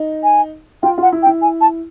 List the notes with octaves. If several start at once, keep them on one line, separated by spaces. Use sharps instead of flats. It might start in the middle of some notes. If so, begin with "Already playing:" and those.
Already playing: D#4
G#5
F4 G5
F4 F#5
E4
G5
E4
G#5
A5